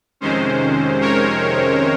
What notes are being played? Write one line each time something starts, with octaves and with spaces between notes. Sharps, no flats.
F2 C3 D#3 G#3 C#4 C5
A#4 C#5